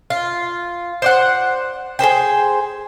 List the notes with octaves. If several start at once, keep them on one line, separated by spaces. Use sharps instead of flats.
F4
C5 D5 F#5
G#4 B4 C5 G5